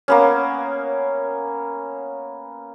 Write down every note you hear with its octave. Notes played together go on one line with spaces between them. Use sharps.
A#3 B3 C#4